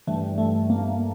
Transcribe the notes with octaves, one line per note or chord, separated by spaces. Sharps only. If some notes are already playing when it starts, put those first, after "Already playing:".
G2 E3 G3 A3
A3
A#3